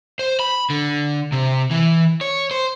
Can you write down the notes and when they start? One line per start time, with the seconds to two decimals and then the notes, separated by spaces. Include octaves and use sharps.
0.19 C5
0.40 B5
0.70 D3
1.32 C3
1.71 E3
2.21 C#5
2.51 C5